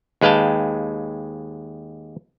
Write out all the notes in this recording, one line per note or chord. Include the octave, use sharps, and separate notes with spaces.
D#2 G#3 B4 F5 G5 A5